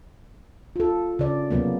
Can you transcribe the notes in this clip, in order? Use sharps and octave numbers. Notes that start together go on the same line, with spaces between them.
F4 A4
C#3 D5
C3 F#3 A#3 B3